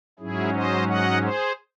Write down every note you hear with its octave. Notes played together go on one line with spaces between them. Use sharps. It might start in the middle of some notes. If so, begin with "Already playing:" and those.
G#2 F#3 C#4 E4 G#4
C5 D#5
D#5 F#5
G#4 C5